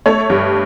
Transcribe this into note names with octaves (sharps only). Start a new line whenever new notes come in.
A3 A4 C#5
G2